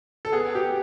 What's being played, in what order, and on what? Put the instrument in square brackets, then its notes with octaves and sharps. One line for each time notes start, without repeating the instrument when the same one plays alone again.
[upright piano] A4
B3 G#4
G4